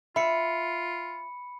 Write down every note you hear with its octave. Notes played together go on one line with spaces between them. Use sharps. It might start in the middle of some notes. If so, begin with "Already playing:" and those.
F4 E5 B5 C#7